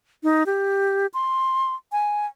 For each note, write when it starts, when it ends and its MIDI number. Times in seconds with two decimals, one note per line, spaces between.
0.23 0.44 63
0.46 1.07 67
1.14 1.74 84
1.92 2.26 80